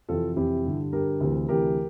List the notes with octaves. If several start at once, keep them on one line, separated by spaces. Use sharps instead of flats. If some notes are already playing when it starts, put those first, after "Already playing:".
F2 C3 E3 F4 A4
F2 C3 E3 E4 G4
G2 D3
G2 D3 G4 A#4
D2 C3 E3
D2 C3 E3 G4 A#4